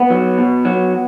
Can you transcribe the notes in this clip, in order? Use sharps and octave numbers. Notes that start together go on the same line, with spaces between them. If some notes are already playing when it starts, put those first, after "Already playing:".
Already playing: B3
F#3
B2
F#3